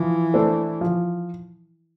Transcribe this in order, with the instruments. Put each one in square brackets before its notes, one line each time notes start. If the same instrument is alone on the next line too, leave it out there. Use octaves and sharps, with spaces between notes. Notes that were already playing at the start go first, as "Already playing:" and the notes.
Already playing: [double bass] E3 [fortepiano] F3
[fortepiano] A3 D4 A4 C5
F3